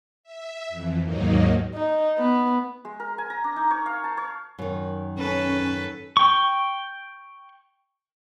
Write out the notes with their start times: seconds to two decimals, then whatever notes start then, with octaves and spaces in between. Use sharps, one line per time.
0.23 E5
0.69 F2 E3
1.02 D#2 G#2 D#3 F#3 A#3 D#4
1.74 D#4
2.18 B3
2.85 G#3
3.00 A#4
3.18 G#5
3.30 A#5
3.44 D4
3.56 D#4
3.71 C#5
3.86 F5
4.04 A5
4.17 C#5
4.58 F#2 D#3
5.18 C#4 A4 B4
6.17 G5 C#6